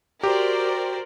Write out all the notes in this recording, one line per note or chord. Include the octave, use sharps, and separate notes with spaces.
F#4 G4 A#4 C5 D5